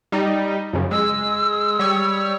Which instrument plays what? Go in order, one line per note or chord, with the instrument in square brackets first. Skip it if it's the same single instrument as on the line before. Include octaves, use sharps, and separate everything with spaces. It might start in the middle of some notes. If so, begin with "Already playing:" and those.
[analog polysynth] G3 D#4
F#2 C#3
[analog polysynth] G#3 [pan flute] E6
[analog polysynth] G3 C#5